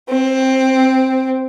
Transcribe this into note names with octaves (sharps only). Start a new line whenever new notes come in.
C4